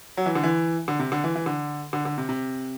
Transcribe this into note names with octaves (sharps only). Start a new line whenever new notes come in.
F#3
E3
D3
E3
D3
C3
D3
E3
E3
D3
D3
D3
C3
C3